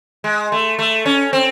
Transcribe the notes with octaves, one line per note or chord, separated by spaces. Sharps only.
G#3
A3
A3
C#4
C4